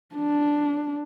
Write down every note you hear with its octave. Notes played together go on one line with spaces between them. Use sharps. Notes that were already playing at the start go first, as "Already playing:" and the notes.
D4